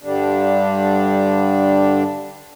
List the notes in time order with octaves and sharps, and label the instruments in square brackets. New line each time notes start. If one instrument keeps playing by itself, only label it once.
[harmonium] G2 D3 G3 D4